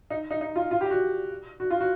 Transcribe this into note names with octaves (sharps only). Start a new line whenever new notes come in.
D#4
D#4
D#4
F4
F4
G4
F#4
F#4
F4
F#4